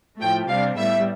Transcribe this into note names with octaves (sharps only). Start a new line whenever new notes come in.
A2 F3 A3 G5
C3 G3 D4 F5
A2 G3 B3 E5